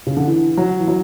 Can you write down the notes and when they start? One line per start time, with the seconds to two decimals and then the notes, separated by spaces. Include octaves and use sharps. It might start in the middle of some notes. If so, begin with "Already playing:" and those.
0.07 C#3
0.17 D3
0.27 E3
0.57 F#3
0.79 E3
0.88 F#3